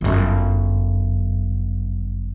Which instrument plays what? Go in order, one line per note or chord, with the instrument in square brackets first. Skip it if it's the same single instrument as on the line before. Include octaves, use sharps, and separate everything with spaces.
[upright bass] G1 F#2